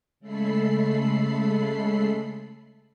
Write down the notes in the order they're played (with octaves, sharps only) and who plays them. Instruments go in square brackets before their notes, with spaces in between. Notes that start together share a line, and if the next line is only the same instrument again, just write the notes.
[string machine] C#3 G#3 A3 A4 B5 C7